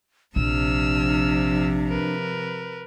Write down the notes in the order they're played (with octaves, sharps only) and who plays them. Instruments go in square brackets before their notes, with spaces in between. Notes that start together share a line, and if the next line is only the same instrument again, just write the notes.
[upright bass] A#1 [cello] C3 F3 [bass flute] D4 [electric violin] E6 F6
[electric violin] A#4 B4